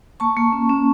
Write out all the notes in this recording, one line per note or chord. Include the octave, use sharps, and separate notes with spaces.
A#3 A5 C#6
A#3
C#4
C#4